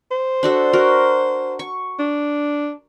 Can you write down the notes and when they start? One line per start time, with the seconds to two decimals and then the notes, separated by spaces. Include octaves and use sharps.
0.11 C5
0.43 D4 F#4 A4
0.73 F#4 A#4
1.59 C#6
1.99 D4